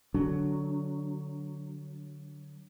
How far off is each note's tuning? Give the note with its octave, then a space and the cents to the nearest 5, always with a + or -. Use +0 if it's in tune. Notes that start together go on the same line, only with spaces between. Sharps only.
D3 +0 F#3 +0 D4 -20